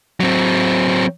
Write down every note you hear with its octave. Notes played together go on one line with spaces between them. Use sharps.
F#3 C4